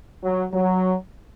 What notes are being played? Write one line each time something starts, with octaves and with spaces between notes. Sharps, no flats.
F#3
F#3